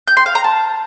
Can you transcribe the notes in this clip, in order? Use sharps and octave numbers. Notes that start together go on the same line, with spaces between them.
G6
C6
F5
A#5
A5